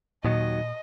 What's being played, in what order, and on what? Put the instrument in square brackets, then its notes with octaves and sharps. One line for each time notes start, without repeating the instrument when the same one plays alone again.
[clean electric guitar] D#2 D#3 F#3 [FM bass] A#2 [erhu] D#5